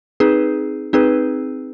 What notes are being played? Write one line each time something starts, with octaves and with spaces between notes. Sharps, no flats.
C4 D#4 G#4 B4
C4 D#4 G#4 B4